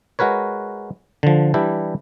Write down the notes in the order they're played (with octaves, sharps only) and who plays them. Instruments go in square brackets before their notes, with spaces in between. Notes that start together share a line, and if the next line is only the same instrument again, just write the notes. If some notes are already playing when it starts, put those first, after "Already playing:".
[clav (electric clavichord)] G#3 F#4 A#4 B4 C#5
D3 F3
E3 G3 D4 E4 G4